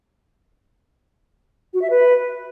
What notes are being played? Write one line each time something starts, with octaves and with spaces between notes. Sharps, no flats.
F#4
E5
B4